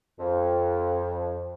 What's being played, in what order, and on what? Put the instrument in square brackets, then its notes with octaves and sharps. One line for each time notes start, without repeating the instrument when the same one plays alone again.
[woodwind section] F2